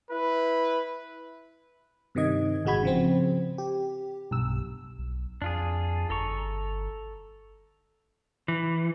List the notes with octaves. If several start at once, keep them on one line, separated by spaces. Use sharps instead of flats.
E4 B4
G2 C3 D#3 D#5 G#6
A1 G#2 G#3 F#4 B5 G#6
C#3 F3 C4
G4
B1 G2 E6
B1
F2 D4 F4 G#4
G1 A4 A#5 C#6
E3